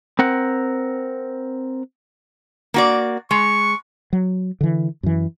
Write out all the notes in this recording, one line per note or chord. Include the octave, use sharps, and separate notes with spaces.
C4 A#4 F#5
A#3 F#4 D5
G#3 C#6
F#3
D3 E3
F#2 E3